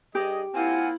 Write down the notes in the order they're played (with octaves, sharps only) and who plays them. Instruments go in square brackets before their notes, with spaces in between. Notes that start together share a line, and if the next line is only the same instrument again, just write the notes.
[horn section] G2 G#4 D#5 [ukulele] G4
[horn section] A#3 C4 F4 [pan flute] E4 [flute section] F#5 G#5